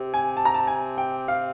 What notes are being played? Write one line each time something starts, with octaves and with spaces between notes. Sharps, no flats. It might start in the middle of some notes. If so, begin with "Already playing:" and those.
Already playing: C3
G#5
A5
A#5
A5
G#5
G5
F5